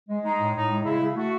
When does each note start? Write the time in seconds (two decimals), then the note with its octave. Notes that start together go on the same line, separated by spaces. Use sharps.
0.09 G#3
0.24 G#3 D#4
0.40 A2
0.55 A2 D#4
0.70 G#3
0.85 C#3 E4
1.00 C#3
1.15 A3 F#4